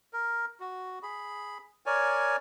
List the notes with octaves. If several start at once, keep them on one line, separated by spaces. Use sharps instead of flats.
A#4
F#4
G#4 B5
A#4 C#5 D5 G#5